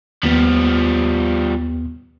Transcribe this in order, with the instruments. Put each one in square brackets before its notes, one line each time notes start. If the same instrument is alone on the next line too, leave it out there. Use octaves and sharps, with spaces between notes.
[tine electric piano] D#2 B3 [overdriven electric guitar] F3 G3